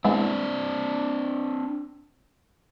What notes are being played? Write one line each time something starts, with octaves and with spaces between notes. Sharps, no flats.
G#3 B3 C4 D4 E4